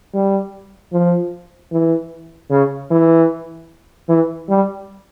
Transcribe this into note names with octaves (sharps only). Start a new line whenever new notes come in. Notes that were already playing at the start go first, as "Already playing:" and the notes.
G3
F3
E3
C#3
E3
E3
G3